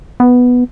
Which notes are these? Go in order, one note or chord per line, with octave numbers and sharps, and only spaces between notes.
B3